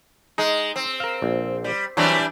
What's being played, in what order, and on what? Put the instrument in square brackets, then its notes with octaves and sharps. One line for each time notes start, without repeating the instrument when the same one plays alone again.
[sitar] G#3 [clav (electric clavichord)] D#4
[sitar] C4
[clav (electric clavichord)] A#4 F5
A#1
[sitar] G3
[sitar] E3 G3 D4 [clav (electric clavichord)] F#3 C4